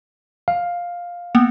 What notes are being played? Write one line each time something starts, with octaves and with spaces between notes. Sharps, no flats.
F5
A#3 B3